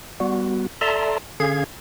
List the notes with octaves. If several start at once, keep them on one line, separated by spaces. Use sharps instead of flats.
G3 B3 F#4
A4 D5 E5 A5 A#5 C6
D3 C#4 G#4 F5 G#6